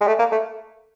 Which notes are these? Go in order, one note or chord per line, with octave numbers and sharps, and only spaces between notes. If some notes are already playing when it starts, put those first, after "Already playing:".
G#3
A3
A#3
A3